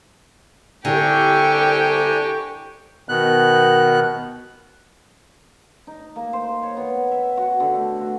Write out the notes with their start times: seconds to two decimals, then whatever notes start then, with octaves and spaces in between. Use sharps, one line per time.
0.85 C2 D3 D4 G4 G5 G#5 A#5 C#6
3.09 B2 D#3 B3 F#6
5.87 D#4
6.16 A#3
6.33 C5
6.63 C#5
6.77 B3
7.12 E5
7.37 F#4
7.60 D3
7.75 A3
8.01 F#4